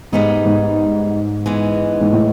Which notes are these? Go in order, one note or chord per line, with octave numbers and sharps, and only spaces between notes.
G#2 G3 B3 D#4 G#4
G#2
E3 G#3 B3
G#2
A2